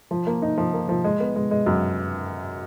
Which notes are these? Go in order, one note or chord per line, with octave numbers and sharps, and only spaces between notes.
F3
A#3
D#4
F3
A#3
F3
G#3
B3
G#3
G#3
F#2